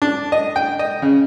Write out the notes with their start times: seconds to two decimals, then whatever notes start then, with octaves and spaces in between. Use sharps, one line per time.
0.02 D4
0.32 D#5
0.56 G5
0.79 D#5
1.02 C#3